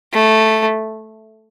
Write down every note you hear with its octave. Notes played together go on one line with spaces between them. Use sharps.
A3